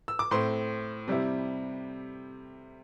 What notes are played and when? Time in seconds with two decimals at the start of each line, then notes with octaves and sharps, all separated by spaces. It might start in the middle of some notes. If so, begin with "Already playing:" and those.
0.08 E6
0.19 D6
0.31 A2 A3 C4 C6
1.08 C3 G3 E4